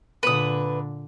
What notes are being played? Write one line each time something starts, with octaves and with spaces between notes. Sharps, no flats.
A#2 D3 B4 D#6